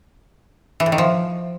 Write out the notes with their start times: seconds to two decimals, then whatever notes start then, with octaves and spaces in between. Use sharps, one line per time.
0.80 E3
0.86 A2
0.92 D#3
0.98 F3